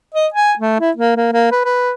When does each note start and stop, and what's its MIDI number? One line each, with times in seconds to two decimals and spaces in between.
0.15 0.28 75
0.34 0.53 80
0.59 0.78 57
0.81 0.91 64
0.97 1.16 58
1.17 1.29 58
1.33 1.49 58
1.52 1.61 71
1.65 1.92 71